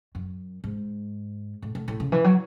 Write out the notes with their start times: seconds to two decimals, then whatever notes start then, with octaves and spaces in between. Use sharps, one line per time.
0.15 F#2
0.64 G#2
1.62 A2
1.75 A2
1.88 A2
2.00 C#3
2.12 E3
2.24 F#3